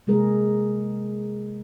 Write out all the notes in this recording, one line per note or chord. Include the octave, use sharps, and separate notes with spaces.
C3 G#3 A#3 G#4 A#4